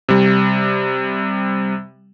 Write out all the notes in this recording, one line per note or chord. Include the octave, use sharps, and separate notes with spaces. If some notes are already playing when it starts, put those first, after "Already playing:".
C3 G3